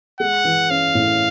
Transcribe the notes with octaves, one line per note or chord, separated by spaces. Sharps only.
G#3 F#5
E3
C#4 F5
A2